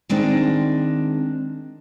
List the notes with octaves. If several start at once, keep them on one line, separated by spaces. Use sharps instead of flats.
D#3 G#3 C4 D4